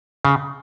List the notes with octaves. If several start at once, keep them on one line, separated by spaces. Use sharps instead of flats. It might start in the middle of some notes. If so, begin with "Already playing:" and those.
C#3